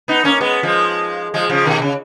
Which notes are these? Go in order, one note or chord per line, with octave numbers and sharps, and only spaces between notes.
B3 D#4
A#3 C#4
G#3 B3
F3 G#3
F3 G#3
C#3 F3
B2 D#3
C#3